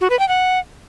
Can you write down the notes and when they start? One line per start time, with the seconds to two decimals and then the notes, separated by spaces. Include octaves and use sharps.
0.01 F#4
0.10 B4
0.19 G5
0.29 F#5